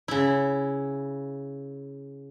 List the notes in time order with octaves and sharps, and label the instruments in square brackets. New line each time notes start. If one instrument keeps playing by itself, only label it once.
[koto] C#3 E4